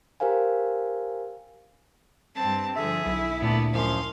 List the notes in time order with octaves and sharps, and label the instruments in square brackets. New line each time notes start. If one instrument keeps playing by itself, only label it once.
[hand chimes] G4 A#4 C5 F5 G#5
[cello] G2 C4 [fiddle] A5
[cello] D3 F3 [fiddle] G#4 [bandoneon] E5
[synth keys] B1 [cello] E4
[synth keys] D2 A#2 A3 [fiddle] B3 D4
[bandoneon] F#2 F3 [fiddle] F5 C6